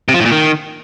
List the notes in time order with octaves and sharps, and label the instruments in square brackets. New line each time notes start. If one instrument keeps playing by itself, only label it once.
[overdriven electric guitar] C3
F3
A2
A#2
D#3